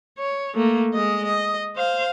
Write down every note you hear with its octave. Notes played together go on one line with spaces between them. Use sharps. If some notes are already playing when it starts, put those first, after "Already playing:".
C#5
A3 A#3
G#3 D#5
D#5
C5 F5